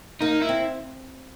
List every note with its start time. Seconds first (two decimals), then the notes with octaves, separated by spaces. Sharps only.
0.21 A#3 D#4
0.42 E4
0.49 C4